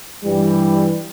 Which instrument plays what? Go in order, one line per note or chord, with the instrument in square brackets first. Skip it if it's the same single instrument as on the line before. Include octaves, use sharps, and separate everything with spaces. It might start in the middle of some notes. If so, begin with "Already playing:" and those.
[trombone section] G2 E3 G3